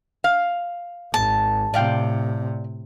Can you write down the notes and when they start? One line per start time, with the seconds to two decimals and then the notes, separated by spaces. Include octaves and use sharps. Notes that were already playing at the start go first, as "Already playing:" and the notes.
0.24 F5
1.14 G#1 A5
1.74 A2 C3 D5 F5 G5